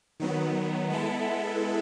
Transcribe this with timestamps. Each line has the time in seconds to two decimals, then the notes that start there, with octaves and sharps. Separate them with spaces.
0.20 D#3 F#3 B3
0.90 G#3 B3 E4 A4